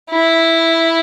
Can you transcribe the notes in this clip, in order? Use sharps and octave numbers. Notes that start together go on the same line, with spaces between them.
E4